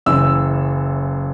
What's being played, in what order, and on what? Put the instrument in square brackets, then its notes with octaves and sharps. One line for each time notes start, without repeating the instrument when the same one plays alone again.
[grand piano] F#1 F#2 E3 E6